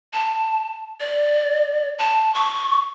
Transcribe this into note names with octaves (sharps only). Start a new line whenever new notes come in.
A5
D5
A5
C#6